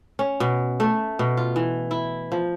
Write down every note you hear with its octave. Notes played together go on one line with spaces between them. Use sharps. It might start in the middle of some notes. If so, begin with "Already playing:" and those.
C#4
B2
A3
B2
F4
E3
E4
F3